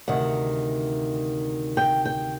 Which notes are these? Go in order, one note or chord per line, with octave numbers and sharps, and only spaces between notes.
D2 C3 D#3 F#5
G5
G5